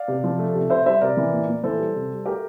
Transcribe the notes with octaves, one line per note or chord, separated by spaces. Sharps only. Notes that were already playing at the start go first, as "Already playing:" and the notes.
Already playing: D5 F5
C3
F3
A3
C3
C3 C5 E5
G3 C5 E5
C3 A#4 D5
E3
A#2
A#2
E3 A4 C5
G3
C3
G3
A3 G4 A#4